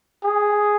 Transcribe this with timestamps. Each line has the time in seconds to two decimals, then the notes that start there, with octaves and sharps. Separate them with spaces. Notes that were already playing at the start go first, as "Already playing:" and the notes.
0.24 G#4